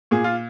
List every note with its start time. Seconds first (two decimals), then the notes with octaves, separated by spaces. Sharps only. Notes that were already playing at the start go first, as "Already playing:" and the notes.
0.11 A#2 G#4
0.24 F4